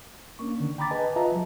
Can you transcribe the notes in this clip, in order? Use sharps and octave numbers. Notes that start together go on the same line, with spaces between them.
A#3 C#4 D4 C#6
D3 D#3 D4
G5 A#5 B5 D6 A6
G#4 B4 D#5 G#5 A5
F4 B4 D#5 E5 A5 A#5
F3 F#3